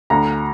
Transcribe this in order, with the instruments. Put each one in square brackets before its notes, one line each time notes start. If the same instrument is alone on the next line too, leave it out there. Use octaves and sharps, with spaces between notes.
[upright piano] D2 A#5